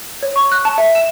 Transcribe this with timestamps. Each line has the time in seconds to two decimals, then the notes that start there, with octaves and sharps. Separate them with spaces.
0.23 C#5
0.36 C#6
0.52 F#6
0.65 A5
0.78 E5
0.95 E7